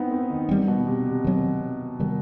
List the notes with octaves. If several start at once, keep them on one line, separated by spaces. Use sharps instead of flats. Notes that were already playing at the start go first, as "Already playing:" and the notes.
Already playing: B3 C4 D#4 E4
C4
D#3
D#3 G3 C4
B2
C3
C3
D#3 F#3 C4
C3 D#3 G3